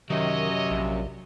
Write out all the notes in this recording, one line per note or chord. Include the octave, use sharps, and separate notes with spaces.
C3 D#3 F#3 C#4 C#5 D#5
A#1